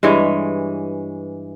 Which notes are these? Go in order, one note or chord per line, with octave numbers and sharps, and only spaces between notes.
G2 E3 G#3 C#5